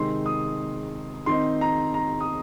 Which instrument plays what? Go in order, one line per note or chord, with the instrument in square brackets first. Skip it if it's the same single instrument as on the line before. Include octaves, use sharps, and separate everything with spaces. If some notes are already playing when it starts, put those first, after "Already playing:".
Already playing: [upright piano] C3 D#3 G#3 C4 D#4 C6
D#6
D#3 C4 D#4 C6
A#5
A#5
D#6